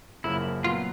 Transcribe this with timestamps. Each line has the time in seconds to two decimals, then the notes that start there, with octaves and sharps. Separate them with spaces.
0.24 F#2 C#3 F3 A#3 C#4 E4
0.64 A#2 F#3 B3 F4